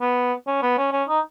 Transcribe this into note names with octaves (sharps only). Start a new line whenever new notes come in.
B3
C#4
B3
C#4
C#4
D#4